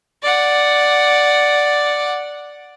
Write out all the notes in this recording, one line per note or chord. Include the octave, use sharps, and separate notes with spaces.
D5 F#5